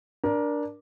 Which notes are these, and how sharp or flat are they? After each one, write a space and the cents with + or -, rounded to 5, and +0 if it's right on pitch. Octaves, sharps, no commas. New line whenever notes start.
D4 +0 A#4 +20